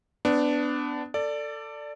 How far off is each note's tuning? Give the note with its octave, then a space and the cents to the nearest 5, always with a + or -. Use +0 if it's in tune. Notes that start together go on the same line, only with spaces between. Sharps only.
B3 +25 D4 +0
A4 +25 D5 +0